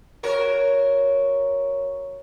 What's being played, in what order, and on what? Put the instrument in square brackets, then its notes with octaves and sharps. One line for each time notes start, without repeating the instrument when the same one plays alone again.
[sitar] F#4 A#4 C#5